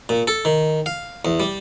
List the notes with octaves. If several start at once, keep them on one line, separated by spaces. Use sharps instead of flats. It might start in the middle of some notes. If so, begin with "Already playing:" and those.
A#2
A4
D#3
F5
E2
G3